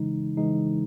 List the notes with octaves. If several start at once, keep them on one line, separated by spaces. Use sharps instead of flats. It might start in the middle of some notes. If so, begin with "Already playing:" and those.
Already playing: C#3 E3 G#3 D#4
C#3 E3 G#3 D#4